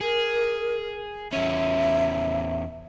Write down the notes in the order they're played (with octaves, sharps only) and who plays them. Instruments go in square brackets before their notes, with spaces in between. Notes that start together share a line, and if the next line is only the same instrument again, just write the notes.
[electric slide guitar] G#4 [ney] A#4
[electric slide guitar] E2 C#4 [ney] E5